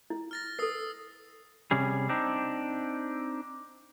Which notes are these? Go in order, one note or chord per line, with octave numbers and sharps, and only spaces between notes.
E4
F6 A6 A#6
A4 B4 D#6 E6 C7
C3 G3 C#4 G#4
C4 D4 D#4